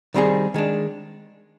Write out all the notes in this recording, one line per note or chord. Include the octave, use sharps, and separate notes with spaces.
D#3 G3 C4 D#4 G#4
D#3 G#3 D4